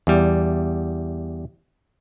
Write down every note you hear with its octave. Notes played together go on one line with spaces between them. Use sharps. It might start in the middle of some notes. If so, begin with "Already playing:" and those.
E2 G3